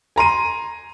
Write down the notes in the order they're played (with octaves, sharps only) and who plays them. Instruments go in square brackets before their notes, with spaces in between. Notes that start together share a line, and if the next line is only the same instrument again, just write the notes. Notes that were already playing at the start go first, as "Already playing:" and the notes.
[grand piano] G#5 A#5 C6 D#7